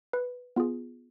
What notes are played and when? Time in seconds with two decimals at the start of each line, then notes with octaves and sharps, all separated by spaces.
0.13 B4
0.56 B3 F4 G#4